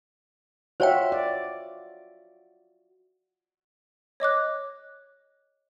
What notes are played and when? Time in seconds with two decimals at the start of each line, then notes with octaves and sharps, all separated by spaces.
0.80 F4 F#4 C5 C#5 E5 G5
1.12 D5
4.20 C#5 D#5 D6 F#6